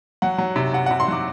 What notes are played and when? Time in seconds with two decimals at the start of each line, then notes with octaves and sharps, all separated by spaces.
0.22 F#3 F#5
0.38 F#3
0.56 C3
0.73 C3 F#5
0.86 F#5
0.91 C3
1.00 C6
1.08 F#3 D6